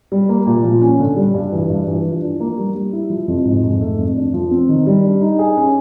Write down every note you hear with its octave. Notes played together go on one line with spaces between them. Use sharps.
G3
A#3
A#2
F3
C#4
D3
G3
G2
E3
G2
E3
F3
D4
A#3
G3
G3
E4
F3
F2
G#2
G#2
A3
F2
D4
F3
C4
D#3
G3
D4
D#4
G#4
C#4